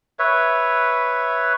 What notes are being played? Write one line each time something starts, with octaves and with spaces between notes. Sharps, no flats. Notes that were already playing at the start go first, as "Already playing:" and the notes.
B4 C#5 E5